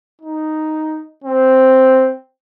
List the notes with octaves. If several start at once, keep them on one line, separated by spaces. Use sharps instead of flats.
D#4
C4